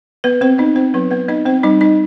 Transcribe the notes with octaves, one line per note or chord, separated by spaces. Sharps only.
B3 B4
C4 C5
B3 D#4 D#5
C4 C5
F#3 B3 B4
B3 B4
B3 D#4 D#5
C4 C5
G3 D#4 D#5
D#4 D#5